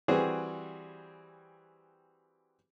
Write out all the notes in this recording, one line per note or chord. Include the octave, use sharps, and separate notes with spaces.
E3 G3 C4 F#4 G#4